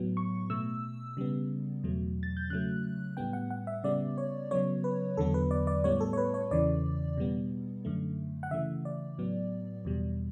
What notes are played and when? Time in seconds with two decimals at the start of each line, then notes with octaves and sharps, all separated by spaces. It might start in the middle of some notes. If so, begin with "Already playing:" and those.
Already playing: A2 F#3 B3
0.17 C#6
0.50 B2 A3 E6
1.17 C#3 G3 B3
1.84 E2 B2 F#3 A3
2.23 A6
2.37 G6
2.50 C#3 F#3 A3 F#6
3.17 A2 G3 B3 G5
3.33 F#5
3.50 F#5
3.67 E5
3.84 C#3 G3 B3 D5
4.18 C#5
4.51 C#3 F#3 B3 C#5
4.84 B4
5.17 E2 D3 F#3 B3 A4
5.34 B4
5.51 D5
5.67 D5
5.84 A2 G3 B3 C#5
6.01 A4
6.13 C#5
6.18 B4
6.34 C#5
6.51 E2 C#3 E3 D5
7.18 B2 G3 B3
7.85 F#2 D3 A3
8.43 F#5
8.51 C#3 E3 A3 E5
8.85 D5
9.18 A2 F#3 B3
9.85 E2 B2 G3